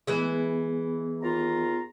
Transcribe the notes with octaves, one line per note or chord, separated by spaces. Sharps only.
E3 G#3 B3 G#4
D#2 F4 A#5